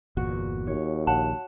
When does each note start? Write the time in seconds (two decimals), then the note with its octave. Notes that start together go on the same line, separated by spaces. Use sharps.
0.17 G1 E2 A#2 F#4
0.67 D#2 C#5
1.07 A#1 F#5 A5